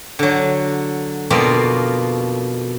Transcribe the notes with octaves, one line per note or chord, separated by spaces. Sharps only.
D3 F#3
F2 B2 A#3 F4 D5